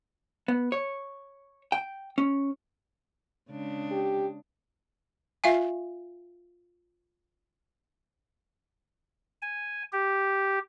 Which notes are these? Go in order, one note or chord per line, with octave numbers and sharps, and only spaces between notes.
B3
C#5
G5
C#4
C#3 G#3 D4
G4
F4 E5 F5 G#5
G#5
G4